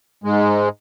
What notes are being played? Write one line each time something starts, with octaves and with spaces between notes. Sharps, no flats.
G#2 G#3